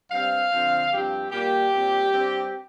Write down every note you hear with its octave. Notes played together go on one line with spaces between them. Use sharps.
G2 G3 C4 F5
D3 F3 C4
G2 F3 C4 G4
A#2 G3 A#3 G4
A#2 G3 C4
G2 G3 C4